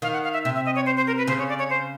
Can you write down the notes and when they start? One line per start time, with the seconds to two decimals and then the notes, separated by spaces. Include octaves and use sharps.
0.02 D#3 F5
0.13 F#5
0.24 F5
0.33 E5
0.45 C3 E5
0.55 E5
0.66 D#5
0.75 C#5
0.86 C5
0.97 C5
1.07 A#4
1.18 B4
1.27 C#3 C5
1.39 C#5
1.49 D5
1.59 C#5
1.70 C5